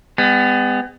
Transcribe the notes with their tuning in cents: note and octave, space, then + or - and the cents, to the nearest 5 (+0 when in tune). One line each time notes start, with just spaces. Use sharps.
G#3 -40 B3 +30